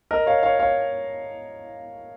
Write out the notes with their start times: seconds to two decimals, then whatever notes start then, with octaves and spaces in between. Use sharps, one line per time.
0.11 A#4 D#5
0.26 C#5 F5
0.43 C#5 F5
0.59 C#5 F5